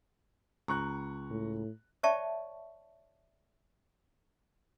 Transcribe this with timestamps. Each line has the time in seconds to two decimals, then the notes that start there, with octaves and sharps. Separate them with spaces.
0.68 C#2 A#5 C#6 F#6
1.30 A2
2.03 C#5 D5 E5 G5 A5 C#6